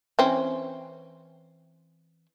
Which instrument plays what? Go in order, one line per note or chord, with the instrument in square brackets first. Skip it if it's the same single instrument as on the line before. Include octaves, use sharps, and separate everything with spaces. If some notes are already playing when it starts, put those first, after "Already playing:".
[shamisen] E3 C4 C#4